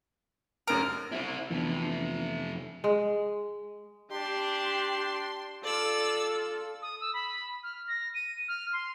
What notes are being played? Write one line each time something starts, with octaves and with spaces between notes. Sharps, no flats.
F1 F#2 A#4 D7
C4 E4
F2 C3 E3 B3 D4
G#3
D4 G4 C6
F4 A4 D5 E6
D#6
E6
B5
F6
A#6
D#7
F6
C6